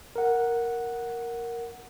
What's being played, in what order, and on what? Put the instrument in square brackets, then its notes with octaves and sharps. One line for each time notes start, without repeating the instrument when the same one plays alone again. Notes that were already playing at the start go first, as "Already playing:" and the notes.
[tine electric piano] A#4 F#5